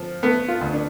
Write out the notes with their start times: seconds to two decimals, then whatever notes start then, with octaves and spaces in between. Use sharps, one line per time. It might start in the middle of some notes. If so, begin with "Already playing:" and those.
Already playing: F3
0.23 A3 B3
0.48 F4
0.61 D2
0.73 D4